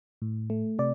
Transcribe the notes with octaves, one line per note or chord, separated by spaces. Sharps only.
A2
A3
C3 D5